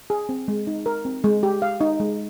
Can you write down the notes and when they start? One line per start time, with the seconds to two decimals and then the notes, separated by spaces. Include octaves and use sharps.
0.10 G#4
0.29 C4
0.48 G#3
0.67 D#4
0.86 A#4
1.05 C4
1.24 G#3
1.43 G4
1.62 F5
1.81 D#4
2.00 G#3